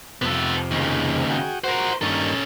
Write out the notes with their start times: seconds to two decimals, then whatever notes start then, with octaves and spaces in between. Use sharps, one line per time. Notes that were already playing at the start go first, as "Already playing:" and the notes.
0.22 F2 C3 B3 A4
0.71 D#2 C#3
1.30 F#4 G#4 G5
1.64 F#4 A#4 C5 F#5
2.01 G2 D#3 A#3 C#4 A4